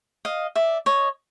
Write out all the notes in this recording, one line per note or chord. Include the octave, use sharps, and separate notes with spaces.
D#5 F5
D5 E5
C#5 D#5